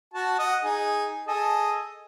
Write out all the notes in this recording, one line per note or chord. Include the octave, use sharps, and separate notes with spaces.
F#4 A5
D#5 F#5
D#4 G#4
G#4 A4 D#5